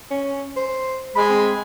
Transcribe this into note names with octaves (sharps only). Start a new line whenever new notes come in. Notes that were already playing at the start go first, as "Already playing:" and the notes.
C#4
C5
G#3 B5
C4